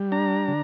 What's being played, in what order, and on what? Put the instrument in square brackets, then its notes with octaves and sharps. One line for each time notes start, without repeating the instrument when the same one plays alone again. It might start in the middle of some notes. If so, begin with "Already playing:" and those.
Already playing: [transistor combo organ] G3
D4 A#5
D3